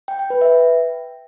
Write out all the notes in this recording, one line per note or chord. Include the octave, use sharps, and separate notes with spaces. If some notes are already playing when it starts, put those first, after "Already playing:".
G5
G5
B4
E5